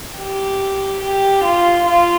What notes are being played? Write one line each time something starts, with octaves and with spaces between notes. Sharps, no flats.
G4
G4
F4
F4